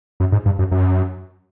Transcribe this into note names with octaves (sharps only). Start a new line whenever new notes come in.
F#2
G#2
G2
F#2
F#2